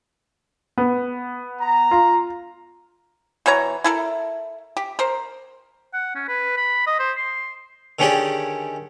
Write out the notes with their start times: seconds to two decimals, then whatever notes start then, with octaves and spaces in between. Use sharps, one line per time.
0.78 B3
1.61 A#5
1.91 F4
3.46 B2 E3 C#5 A#5
3.84 E4 A4 A#4
4.77 G4
4.99 A#4 C5
5.93 F#5
6.15 C#4
6.28 B4
6.57 B5
6.86 D#5
6.99 C5
7.17 C6
7.99 D3 D#3 C#4 G4 G#4 D5